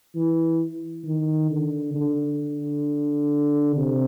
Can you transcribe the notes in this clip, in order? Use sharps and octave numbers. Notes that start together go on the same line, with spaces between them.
E3
D#3
D3
D3
C3